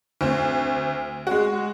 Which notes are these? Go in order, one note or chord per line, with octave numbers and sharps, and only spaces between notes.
D2 C4
G#3 F#4